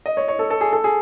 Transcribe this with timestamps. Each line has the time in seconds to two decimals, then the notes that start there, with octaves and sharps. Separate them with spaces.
0.06 D#5
0.17 C#5
0.28 C#5
0.39 A4
0.50 A4
0.61 G#4
0.73 A4
0.84 G#4